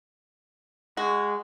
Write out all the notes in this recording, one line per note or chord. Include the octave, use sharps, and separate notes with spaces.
G#3 F#4